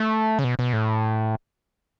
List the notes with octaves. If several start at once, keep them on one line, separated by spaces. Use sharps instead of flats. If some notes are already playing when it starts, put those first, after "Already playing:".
Already playing: A3
C#3
B2
B2
A2